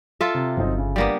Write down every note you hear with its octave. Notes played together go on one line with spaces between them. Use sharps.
F4 A4 E5
C3
G1 F#3 C4 D#4
C#3
G3 A#3 B3 D4 D5